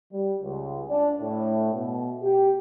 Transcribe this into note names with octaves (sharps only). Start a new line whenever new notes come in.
G3
C#2
D4
A2
B2
G4